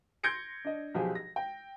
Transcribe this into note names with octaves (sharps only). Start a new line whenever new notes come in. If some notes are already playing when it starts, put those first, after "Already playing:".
C6 G6 G#6 A#6 C#7 D7
D4 D#5
B1 F3 G4 G#4
A#6
G5